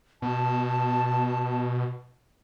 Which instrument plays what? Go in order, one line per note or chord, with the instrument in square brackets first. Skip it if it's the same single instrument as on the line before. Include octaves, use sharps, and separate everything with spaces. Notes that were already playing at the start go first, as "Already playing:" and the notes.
[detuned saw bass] B2 [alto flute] A5